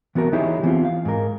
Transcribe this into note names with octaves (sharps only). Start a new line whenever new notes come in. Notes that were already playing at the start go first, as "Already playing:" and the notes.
E3 B3 F#4 A#4
E3 D#4 E4 G4 G#4 C#5
E3 B3 C4 F4
F5
G#2 A#4